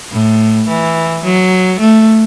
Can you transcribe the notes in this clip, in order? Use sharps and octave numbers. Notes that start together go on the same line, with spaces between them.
A2
E3
F#3
A3